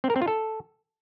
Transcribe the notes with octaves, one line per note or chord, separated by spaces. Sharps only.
C4
A#4
C4
F4
A4